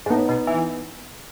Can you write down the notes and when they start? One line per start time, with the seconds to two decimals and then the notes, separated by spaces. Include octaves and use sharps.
0.06 G#2
0.10 A2 B3 D#4
0.29 B2
0.47 E3